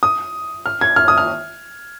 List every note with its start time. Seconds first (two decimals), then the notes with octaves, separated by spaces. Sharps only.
0.03 D#6
0.66 F6
0.81 G#6
0.96 F6
1.08 D#6
1.18 F6